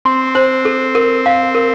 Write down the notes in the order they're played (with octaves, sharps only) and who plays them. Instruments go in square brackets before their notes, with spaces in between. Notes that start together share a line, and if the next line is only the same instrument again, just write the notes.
[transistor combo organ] C4 [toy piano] C6
[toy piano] C5
A4
A#4
F5
A#4